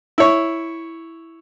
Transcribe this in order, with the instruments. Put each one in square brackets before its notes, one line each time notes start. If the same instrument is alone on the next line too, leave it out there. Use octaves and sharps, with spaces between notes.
[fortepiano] E4 C#5